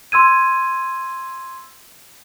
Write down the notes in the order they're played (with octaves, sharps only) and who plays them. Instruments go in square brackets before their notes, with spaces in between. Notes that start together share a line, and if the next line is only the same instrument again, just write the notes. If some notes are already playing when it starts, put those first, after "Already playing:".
[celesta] C6 E6 G#6 D#7